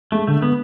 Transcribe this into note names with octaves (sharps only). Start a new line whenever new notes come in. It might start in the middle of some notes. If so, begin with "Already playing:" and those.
G#3 A3
D3 A3
B3